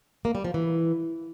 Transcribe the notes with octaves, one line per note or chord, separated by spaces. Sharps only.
A#3
G3
F3
E3